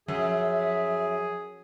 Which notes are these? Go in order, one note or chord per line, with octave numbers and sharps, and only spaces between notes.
F#2 F3 G#4 E5